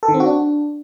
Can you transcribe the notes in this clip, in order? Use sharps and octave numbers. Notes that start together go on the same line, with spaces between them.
A4
D#3
C4
F#4
D4